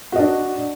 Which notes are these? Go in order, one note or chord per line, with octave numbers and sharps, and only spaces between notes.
D4 F#4 D#5